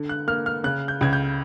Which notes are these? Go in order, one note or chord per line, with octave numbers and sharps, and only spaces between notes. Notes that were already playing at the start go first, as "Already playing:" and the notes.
Already playing: D3
F#6
A#3 F6
F6
C#3 F#6
G6
C#2 G#6
G6